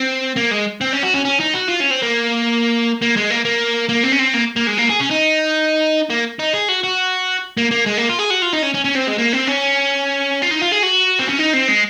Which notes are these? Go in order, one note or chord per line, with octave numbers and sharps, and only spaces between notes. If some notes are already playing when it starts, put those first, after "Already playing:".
Already playing: C4
A#3
G#3
C4
C#4
F#4
C#4
C#4
D#4
F#4
F4
C#4
C4
A#3
A#3
G#3
A#3
A#3
A#3
C4
C#4
C4
A#3
A#3
G#3
A#3
G#4
C#4
D#4
A#3
D#4
G#4
F#4
F#4
A#3
A#3
G#3
A#3
F4
G#4
F#4
F4
D#4
C#4
C#4
C#4
C4
G#3
A#3
C4
C#4
F4
D#4
F4
G#4
F#4
C4
C#4
D#4
C4
G#3